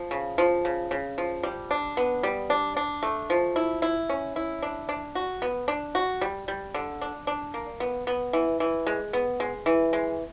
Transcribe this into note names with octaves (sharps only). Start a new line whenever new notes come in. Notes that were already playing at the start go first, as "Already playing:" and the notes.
Already playing: F3
C#3
F3
C#3
C#3
F3
G3
D4
B3
G3
D4
D4
A3
F3
E4
E4
C#4
E4
D4
D4
F#4
B3
D4
F#4
G3
G3
D3
D4
D4
A#3
B3
B3
E3
E3
G#3
B3
G#3
E3
G#3